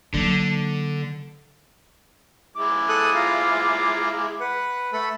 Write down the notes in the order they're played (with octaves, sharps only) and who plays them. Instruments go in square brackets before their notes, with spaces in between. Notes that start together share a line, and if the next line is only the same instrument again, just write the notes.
[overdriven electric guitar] D3 [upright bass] F#3 A#3
[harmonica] G#3 E4 D6
[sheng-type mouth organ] A4 D#6 F#6
F4 F5 A#5
B4 F#5
A3 A4 B5